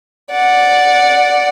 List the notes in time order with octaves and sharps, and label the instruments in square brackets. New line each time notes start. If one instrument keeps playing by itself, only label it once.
[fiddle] D5 F#5